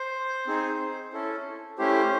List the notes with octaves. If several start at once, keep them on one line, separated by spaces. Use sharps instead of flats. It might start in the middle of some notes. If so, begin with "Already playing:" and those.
Already playing: C5
C4 D#4 G#4
C#4 E4 A4
A3 C#4 E4 G4 C5